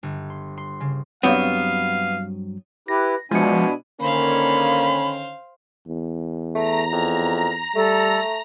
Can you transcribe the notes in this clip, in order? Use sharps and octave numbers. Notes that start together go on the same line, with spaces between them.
G1
C6
C6
C#3
G2 F#3 B3 C4 F5
E4 G4 B4 A#6
B2 F3 G#3 D4 E4 G#5 C#7
D3 D#3 A#3 C#4 C5 F5 B5
E2
A3 A#5
F2
G3 A3 A4